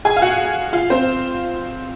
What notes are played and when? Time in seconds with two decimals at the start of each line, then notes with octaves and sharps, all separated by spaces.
0.05 G#4 G#5
0.17 F5
0.22 F#4 F#5
0.73 F4 F5
0.90 C4 C5